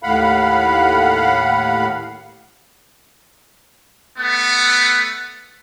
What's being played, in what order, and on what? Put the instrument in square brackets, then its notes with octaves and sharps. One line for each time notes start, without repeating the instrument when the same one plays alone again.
[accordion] D#2 A2 F5 F#5 B5
[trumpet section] A3 B3